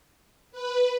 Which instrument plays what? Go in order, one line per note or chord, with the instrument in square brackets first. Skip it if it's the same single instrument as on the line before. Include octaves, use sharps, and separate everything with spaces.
[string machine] B4